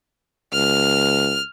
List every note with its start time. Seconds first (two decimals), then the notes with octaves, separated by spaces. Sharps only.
0.53 C#2 F6